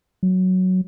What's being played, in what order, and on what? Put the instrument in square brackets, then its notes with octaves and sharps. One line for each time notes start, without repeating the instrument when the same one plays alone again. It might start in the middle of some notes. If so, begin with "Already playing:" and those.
[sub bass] F#3